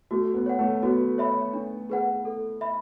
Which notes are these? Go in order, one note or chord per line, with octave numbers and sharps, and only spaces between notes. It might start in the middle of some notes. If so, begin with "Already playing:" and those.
A3 F#4
B3
C#5 F#5
A3
B3 F#4
C#5 E5 B5
D4
G#4 B4 F#5
A4
E5 B5